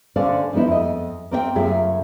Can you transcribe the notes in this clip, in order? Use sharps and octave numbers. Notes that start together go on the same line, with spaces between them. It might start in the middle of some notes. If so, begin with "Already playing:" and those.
D3 C#4 A4 C5 D5 F5
F3 G#3 B3 D#4 E4
F2 D#5
A#3 C4 D#5 G5
F#2 C#3 A3 F4 G#4 E5